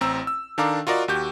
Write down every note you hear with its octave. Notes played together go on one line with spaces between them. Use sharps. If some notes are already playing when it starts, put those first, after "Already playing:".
A1 C4 A#5 E6
E6
D#3 D4 A4 F5 A#5 D6
F4 F#4 A#4 D5 D#5
D#2 F#4 G4 G6